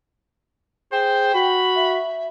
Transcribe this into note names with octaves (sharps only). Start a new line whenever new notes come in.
G#4 C5 G5
F#4 B5
E5